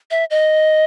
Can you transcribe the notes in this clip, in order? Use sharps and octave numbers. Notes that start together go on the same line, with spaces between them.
E5
D#5